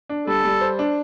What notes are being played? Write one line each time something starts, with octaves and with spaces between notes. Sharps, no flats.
D4
G3 A4
G3
C5
D4